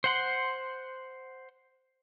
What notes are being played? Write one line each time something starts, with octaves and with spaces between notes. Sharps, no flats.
C5 F#5 C6